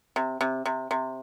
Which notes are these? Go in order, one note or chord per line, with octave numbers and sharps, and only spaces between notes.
C3
C3
C3
C3